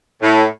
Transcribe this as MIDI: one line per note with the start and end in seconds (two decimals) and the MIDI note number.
0.22 0.45 45